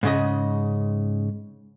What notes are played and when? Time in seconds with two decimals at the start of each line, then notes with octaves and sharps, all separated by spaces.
0.03 G#2 C#3 D#5